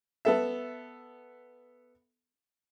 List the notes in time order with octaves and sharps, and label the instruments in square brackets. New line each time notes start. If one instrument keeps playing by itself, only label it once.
[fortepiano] B3 A4 E5